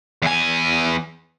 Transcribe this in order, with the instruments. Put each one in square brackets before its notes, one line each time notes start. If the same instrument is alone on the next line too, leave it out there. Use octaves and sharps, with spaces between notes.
[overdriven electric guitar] E2 G#5